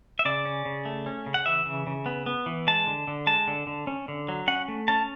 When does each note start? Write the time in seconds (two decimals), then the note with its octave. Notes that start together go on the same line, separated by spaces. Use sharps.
0.19 E5
0.25 C#3 D5
0.45 C#4
0.65 C#3
0.85 A3
1.06 C#4
1.26 C#3
1.34 F#5
1.46 E3 E5
1.66 C#3
1.87 C#3
2.06 B3
2.26 B3
2.46 E3
2.67 G#3 A5
2.87 D3
3.07 D3
3.27 G#3 A5
3.47 D3
3.67 D3
3.87 C#4
4.08 D3
4.29 F#3
4.48 C#4 F#5
4.68 A3
4.88 C#4 A5